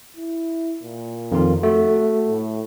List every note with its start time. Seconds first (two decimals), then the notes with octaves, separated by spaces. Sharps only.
0.17 E4
0.83 A#2
1.32 F2 D#3 F4
1.63 A3 F#4
2.28 A2